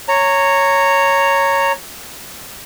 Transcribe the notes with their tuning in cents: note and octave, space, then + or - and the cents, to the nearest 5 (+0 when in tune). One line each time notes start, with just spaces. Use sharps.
C#5 +0 A#5 -15